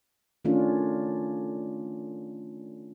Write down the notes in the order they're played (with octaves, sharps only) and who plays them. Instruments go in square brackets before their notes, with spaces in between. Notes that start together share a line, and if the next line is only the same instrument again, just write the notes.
[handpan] D#3 A3 C#4 D4 F4